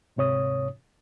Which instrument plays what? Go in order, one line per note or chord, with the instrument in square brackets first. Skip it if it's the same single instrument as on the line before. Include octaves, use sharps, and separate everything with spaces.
[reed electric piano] D2 G#2 C3 C#5 D#6